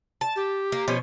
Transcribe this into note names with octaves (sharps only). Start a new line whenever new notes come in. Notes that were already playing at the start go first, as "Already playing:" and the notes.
A5
G4
A#3
B2 F3 C#4